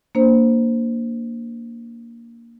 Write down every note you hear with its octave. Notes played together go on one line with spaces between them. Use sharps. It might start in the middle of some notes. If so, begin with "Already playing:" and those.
A#3 D4 C5